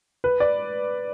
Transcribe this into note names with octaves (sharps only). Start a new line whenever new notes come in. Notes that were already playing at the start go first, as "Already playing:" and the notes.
B4
D5